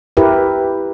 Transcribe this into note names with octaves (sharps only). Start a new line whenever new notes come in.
E4 G4 A#4 B4